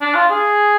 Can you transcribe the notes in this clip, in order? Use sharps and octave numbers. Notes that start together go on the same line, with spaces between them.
D4
F4
G#4